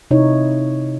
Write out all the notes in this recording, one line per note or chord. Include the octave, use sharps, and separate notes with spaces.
C3 D#4 E4 C#5